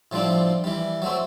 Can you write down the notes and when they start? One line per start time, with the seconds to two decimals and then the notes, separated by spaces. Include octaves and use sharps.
0.12 A2 F3 G3 C4 D4
0.64 E3 G3
1.02 F#3 A3 C4